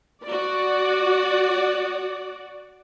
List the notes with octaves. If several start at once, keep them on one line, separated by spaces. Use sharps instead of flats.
F#4 D5